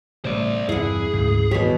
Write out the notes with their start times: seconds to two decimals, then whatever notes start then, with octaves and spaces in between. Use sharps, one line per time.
0.25 A2 C#3 G3 C5 D5
0.69 E2 G2 C3 E4 G#4 F#5
1.13 D2 G#2 C#3
1.51 D#1 B2 E3 G3 G4 C#5 B6